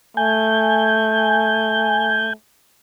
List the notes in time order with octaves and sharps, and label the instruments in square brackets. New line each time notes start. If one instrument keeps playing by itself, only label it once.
[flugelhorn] A3 [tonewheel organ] G#5 G6